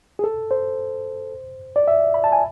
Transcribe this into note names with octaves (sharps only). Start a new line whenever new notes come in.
G#4
A4
C5
D5
E5
B5
A5
G#5